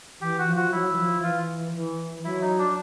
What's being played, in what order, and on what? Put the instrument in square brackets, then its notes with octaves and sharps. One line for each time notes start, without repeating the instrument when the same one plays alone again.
[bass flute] E3 [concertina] G4
[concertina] F#4
[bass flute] F3
[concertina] F#4
[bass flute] F#3 [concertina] E4
[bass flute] E3
F3
[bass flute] E3 [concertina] F4
[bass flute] E3
[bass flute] F#3 [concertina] E4
[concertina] D#4
D4